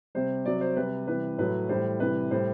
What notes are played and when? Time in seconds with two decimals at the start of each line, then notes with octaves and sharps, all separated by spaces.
0.15 C3 G3 C5
0.45 C3 F#3 D5
0.61 C5
0.76 C3 G3 B4
1.07 C3 E3 G3 B4
1.38 A2 F#3 B4
1.69 A2 E3 G3 C5
2.00 C3 E3 G3 B4
2.31 A2 G3 C5